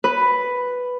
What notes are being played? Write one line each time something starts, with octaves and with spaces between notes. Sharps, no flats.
B4